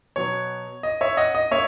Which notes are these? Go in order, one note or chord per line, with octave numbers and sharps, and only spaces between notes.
B2 F#3 B3 C#5
D#5
C#5 E5
D#5 F#5
D#5
A#3 C#5 E5